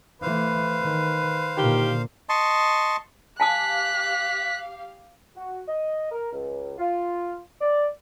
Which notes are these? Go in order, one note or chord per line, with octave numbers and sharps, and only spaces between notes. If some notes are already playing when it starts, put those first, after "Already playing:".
E3 A3 B4 C5 F5
D#3
A#2 D3 D#3 G4
D#5 A5 C6 C#6
G4 F5 G#5 A5 D#6 F#6 B6
F#4
D#5
A#4
C#2
F4
D5